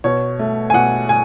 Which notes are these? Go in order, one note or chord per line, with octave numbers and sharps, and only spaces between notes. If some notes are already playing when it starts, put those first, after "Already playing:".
B2 C#5
A3
G#5
B2 F#5
G#5